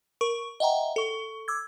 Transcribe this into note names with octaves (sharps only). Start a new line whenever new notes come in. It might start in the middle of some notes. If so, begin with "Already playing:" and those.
A#4 C#6
D#5 E5 F#5 G5 A#5
A4 C#6
D6 E6 G#6